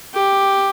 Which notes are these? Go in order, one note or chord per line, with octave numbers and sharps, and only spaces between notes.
G4